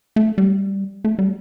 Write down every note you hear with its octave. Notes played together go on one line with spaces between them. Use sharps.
A3
G3
A3
G3